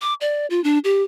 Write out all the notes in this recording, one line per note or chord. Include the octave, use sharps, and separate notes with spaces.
D6
D5
F4
D4
G4